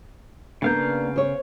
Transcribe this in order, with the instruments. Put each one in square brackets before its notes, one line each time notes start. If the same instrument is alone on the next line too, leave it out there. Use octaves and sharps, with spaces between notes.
[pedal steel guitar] C#3 F5 G6 [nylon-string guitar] A#3 B3 D4
[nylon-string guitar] C5 C#5